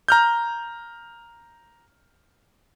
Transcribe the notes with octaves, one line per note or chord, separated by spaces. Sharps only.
A#5 F6 G6